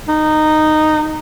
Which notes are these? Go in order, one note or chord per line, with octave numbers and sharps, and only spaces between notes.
D#4